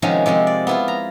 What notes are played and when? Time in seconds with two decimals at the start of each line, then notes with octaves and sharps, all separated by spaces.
0.02 C3 D#3 F3 G#3 C#4 F#4
0.26 C3 F3 G#3 C4
0.47 D5
0.67 B3 E4 F4
0.88 A#5